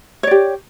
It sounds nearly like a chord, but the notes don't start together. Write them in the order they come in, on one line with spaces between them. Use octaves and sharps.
C#5 D5 G4